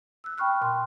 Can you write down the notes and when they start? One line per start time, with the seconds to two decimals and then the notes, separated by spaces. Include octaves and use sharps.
0.24 E6 F#6
0.38 G5 B5 C#6 F6 F#6
0.61 A#2 C6